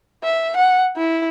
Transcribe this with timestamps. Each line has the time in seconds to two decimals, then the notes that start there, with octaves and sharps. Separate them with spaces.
0.24 E5
0.56 F#5
0.97 E4